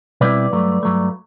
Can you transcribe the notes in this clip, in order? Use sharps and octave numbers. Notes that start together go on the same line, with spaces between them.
B2 G3 C4 E4 B4 D5
G2 F#3 A3
G2 F#3 A3